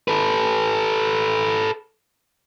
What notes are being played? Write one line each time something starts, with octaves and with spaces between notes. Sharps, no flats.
A4 B4